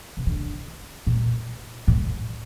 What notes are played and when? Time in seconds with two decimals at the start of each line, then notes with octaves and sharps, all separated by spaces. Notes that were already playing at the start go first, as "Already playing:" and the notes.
0.17 C3
0.27 D3
1.07 A#2
1.88 A2